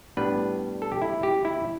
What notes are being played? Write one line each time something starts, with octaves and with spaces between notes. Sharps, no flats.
A2 G3 B3 D4 B4
A4
G4
E4
G4
E4